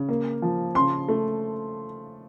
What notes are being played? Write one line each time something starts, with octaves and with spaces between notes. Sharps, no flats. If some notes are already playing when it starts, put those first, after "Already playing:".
Already playing: C#3
A#3
F3
C#3 C6
A3